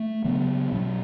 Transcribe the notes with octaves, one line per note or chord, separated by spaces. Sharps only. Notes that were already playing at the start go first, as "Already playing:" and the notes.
Already playing: A3
C#3 F#3 B3
B2 F#3 C#4